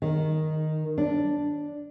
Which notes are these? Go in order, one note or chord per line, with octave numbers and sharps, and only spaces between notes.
D#3
D4